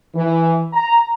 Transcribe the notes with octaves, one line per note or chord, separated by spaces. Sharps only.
E3
A#5